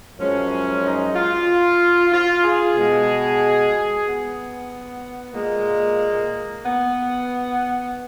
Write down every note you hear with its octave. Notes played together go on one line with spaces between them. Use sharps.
F#2 F3 G#3 C#4
D#4
F4
F4
G#4
B2 G#3
B3
A#2 G#3 A#3
B3